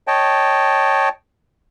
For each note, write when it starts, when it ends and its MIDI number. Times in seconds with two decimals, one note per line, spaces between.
0.07 1.09 73
0.07 1.09 75
0.07 1.09 79
0.07 1.09 81